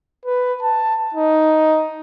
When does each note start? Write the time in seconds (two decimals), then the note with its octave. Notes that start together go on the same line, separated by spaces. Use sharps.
0.25 B4
0.63 A5
1.14 D#4